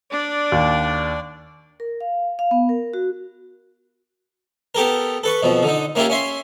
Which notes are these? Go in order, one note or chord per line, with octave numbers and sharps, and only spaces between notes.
D4 D5
D#2
A#4
F5
F5
B3
A#4
F#4
B3 G4 A4 A#4
A4 B4 C#6
F2 B2 F3
D3 D#4
A#3 C#4 E4 F4 G4
C#4 E5 C6